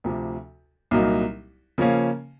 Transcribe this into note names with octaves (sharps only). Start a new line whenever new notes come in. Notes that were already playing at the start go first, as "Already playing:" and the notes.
D2 C3 F3
C2 A#2 F#3 A#3 D#4
C#3 F3 A#3 C#4